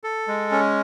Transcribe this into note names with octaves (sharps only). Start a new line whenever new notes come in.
A4
G#3
C#4